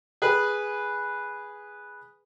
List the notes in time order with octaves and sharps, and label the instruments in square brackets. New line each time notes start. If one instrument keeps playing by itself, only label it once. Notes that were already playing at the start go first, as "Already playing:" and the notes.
[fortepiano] G#4 B4 G#5